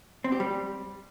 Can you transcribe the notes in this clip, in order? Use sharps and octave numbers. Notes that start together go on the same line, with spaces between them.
C4
G4
G3